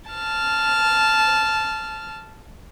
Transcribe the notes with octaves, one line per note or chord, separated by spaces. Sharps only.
A5 F6